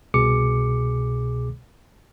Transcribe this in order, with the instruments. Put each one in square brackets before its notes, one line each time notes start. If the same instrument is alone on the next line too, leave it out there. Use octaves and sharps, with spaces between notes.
[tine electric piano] C2 B2 G#4 D6 C#7